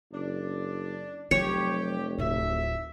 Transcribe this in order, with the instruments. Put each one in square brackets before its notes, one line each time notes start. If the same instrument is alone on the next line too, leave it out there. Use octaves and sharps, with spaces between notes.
[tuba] F#1 [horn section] D4
[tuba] F1 [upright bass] F#3 [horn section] G4 [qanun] C#5
[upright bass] D1 D#4 [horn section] E5